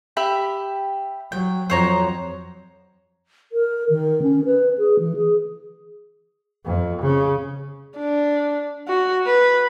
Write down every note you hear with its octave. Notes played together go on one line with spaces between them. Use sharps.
G4 E5 B5
F#3 G5
F2 F#3 C5 C#5 A#5
A#4
D#3
C#4
B4
G#4
E3
G#4
F2
C#3
D4
F#4
B4